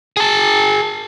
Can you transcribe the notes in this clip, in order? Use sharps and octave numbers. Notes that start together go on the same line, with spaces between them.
G#4 A5